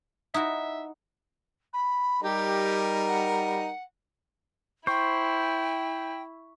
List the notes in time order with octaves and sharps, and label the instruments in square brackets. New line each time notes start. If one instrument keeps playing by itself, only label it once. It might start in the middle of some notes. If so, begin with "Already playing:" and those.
[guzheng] D#4 E4 F#4 [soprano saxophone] E5
[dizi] B5
[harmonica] G3 D#4 A#4 [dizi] G4
[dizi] F#5
[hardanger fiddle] E4 [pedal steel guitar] C5 [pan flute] G5 [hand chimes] C#6